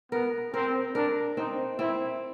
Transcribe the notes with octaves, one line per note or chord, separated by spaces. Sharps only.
B3 A#4
C4 A#4
D4 A#4
C4 D#4
C4 E4